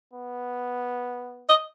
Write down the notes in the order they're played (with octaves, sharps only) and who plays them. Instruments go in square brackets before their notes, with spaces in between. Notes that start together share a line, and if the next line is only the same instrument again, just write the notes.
[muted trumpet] B3
[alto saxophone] D#5